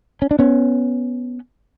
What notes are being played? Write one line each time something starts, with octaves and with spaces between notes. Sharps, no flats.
C#4
D4
B3 C#4